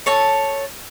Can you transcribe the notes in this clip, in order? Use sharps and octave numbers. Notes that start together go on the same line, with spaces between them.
A4 C#5 A5